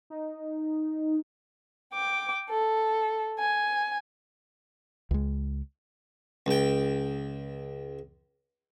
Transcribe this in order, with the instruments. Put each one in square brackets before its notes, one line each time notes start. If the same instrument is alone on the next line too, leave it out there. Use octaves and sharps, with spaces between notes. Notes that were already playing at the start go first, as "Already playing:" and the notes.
[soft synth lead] D#4
[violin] G5 D6
A4
G#5
[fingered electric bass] C#2 G#3
[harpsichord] C#2 G5